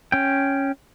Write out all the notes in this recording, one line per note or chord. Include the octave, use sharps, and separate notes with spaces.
C#4 G5